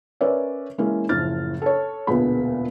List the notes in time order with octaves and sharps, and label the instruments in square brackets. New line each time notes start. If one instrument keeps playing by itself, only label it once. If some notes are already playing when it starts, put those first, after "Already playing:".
[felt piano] C#4 A#4 B4 C#5 D5 E5
E3 G#3 A#3 C#4 E4
F#1 A2 F3 F6 A6
A4 C#5
E1 D2 A#2 B3 G#4 B5